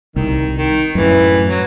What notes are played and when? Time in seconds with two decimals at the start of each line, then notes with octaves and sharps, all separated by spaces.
0.16 C2 D#3
0.56 D#3
0.95 F#2 A2 E3
1.49 F#3